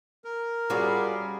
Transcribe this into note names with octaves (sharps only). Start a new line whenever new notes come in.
A#4
G3 C#4 F4 F#4 G#4